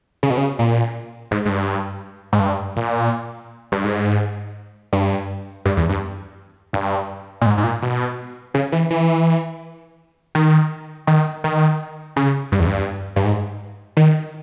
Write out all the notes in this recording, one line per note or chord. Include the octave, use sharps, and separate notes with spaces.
C#3
B2
C#3
A#2
G#2
G#2
G2
G#2
G2
A#2
G2
G#2
G2
G2
E2
G2
G2
A#2
G#2
G#2
A#2
B2
C#3
E3
E3
D#3
D#3
D#3
C#3
G2
E2
G2
G2
G#2
D#3